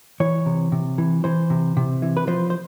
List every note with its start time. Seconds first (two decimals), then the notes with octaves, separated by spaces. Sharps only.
0.20 E3 C#5
0.46 C3
0.72 C3
0.98 E3
1.24 E3 C5
1.50 C3
1.77 C3
2.02 E3
2.17 B4
2.27 F3 C5
2.50 C5